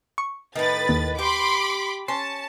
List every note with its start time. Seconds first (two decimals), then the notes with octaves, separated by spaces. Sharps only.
0.18 C#6
0.56 A2 D#3 B4 A6
0.89 D#2
1.19 G4 B5 C6 D6
2.08 C#4 A5 C6